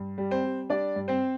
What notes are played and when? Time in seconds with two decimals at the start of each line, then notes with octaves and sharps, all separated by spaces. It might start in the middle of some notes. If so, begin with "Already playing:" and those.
Already playing: G2
0.18 G3
0.31 C4 C5
0.44 G3
0.70 G3 D4 D5
0.96 G2
1.08 C4 C5